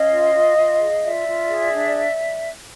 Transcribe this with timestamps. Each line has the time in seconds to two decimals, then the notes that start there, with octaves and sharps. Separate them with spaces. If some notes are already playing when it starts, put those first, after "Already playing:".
Already playing: C#4 D#5 F5
0.10 F4
0.33 F4
0.56 F4
0.79 G#4
1.02 F4 D5 E5
1.25 F4
1.48 G#4
1.72 D4